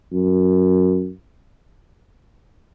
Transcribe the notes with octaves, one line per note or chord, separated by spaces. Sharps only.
F#2